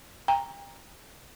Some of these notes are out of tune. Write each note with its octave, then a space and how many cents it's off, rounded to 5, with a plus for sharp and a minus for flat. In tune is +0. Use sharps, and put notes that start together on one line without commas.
G5 +30 A#5 +0